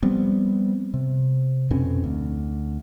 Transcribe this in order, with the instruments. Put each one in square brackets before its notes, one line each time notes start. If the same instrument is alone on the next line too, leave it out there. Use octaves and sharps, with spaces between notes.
[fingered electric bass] F3 G3 B3 C4
C3
F2 B2 C4 C#4
D2